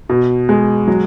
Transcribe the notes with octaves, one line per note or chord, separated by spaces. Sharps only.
B2
G#3
F#3